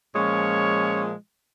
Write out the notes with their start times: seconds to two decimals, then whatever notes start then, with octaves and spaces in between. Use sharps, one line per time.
0.15 A#2 F3 G#3 C#4 C#5